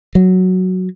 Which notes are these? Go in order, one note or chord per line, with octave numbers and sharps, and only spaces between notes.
F#3